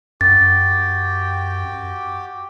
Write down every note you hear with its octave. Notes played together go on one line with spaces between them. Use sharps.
F#2 F#4 G4 G5 A6